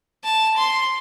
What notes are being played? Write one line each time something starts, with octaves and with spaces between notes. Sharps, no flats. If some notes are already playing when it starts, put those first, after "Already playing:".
A5
C6